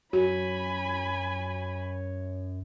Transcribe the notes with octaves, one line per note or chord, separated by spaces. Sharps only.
F#2 F#4 C#5 G#5 B5